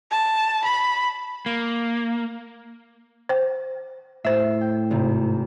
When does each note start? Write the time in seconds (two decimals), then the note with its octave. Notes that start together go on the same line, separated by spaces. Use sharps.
0.11 A5
0.64 B5
1.46 A#3
3.29 C5 G5
4.25 A2 C5 E5 E6 C7
4.61 G5
4.91 G#1 C3